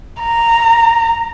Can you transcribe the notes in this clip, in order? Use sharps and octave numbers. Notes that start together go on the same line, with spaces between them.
A#5